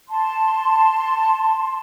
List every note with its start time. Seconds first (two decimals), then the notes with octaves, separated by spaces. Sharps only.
0.09 A5 C6